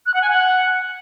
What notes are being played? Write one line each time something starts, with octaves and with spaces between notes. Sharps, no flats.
F#6
F#5
G#5
F#5